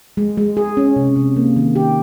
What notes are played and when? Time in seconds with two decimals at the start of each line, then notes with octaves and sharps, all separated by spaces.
0.17 G#3
0.37 G#3
0.57 G#4
0.77 C#4
0.96 C3
1.16 C3
1.37 A#3
1.56 D#3
1.76 G4